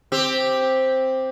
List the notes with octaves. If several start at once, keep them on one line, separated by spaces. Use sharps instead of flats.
C4 G4